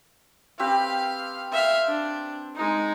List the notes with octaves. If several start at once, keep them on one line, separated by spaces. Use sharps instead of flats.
C4 G4 B4 F5
E5 F5
D4
G#3 D#4